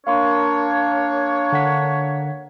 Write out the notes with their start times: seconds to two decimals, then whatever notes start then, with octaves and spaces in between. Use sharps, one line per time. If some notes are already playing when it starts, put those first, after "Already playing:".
0.07 A#3 D4 C#5 F5 C6
1.52 D3 F#5 B6